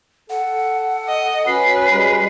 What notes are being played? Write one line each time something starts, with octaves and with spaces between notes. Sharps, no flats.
A4 F#5
D#5
C#4 F#4 B4 C7
G3 G#3